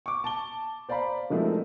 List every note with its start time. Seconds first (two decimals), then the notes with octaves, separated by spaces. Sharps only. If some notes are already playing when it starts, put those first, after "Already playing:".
0.06 C#6 D6
0.24 A5 G7
0.89 C5 D5 F5 A#5 B5
1.30 D#3 F3 G#3 A3 C4 E4